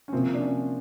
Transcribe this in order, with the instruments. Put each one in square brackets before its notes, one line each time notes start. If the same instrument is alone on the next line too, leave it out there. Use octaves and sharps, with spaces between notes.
[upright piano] C#4
[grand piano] C3 F3 A#3 [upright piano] C4
[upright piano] D4
C#4